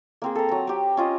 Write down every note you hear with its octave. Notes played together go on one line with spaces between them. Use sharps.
A#3 C4 G#4
A4 A#5
F#3 A#5
C4 G4
C#4 F4 D#5